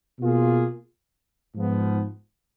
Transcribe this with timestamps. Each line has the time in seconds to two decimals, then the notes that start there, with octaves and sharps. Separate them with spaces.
0.20 B2 A#3 F4 G#4
1.55 G#2 F3 B3